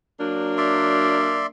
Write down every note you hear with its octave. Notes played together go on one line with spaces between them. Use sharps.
F#3 A#3 D4
D5 E5 C6